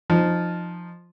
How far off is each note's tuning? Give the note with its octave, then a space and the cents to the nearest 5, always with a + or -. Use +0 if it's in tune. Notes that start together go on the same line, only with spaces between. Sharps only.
F3 +0 D#4 -20